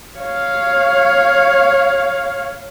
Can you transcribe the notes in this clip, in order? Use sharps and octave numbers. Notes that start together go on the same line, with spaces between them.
C#5 F5